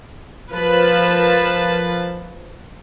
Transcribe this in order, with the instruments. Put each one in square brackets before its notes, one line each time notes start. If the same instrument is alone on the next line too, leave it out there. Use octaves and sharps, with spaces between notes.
[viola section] F3 A#4 B4 A5